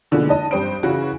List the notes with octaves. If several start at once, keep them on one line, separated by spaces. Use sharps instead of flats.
B2 D3 E3 F3 G#3 A#3
D#4 D#5 A5
G2 C4 G4 C5 D#6 D7
C#3 E3 C#4 E4 F#4